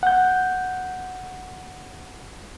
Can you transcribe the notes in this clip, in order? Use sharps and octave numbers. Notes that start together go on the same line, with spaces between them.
F#5 G6